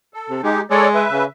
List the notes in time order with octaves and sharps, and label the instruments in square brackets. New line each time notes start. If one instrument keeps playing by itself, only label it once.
[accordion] A4
[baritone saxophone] C3
[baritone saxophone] G#3 [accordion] D#4 G4
[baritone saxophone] G#3 [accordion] A4 C#5 D5
[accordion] B4 E5
[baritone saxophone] C#3